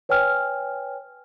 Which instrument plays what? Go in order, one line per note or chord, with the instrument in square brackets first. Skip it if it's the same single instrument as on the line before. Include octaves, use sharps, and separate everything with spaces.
[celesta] B4 C#5 G5 G#5 F6